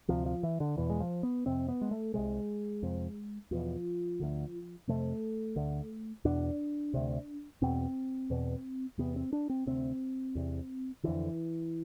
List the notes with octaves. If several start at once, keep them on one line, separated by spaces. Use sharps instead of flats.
D2 C3 F3
F3
E3
D3
E2 B2 E3
G#3
F3
B3
F2 C3 C4
B3
G#3
A3
C2 C3 G#3
F2 C3
E2 B2 F3
D2 D3
F2 C3 A3
D2 D3
E2 B2 D4
D2 C3
E2 B2 C4
E2 B2
E2 C3 B3
C4
D4
C4
D2 C3 C4
E2 C3
F2 D3 E3